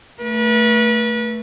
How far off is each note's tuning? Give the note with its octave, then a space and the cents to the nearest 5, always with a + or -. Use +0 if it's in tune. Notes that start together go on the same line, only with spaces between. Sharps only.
A3 +10 B4 -35